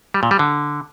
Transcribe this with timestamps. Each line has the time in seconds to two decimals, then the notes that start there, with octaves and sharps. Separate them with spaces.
0.14 G3
0.23 A#2
0.31 G3
0.39 D3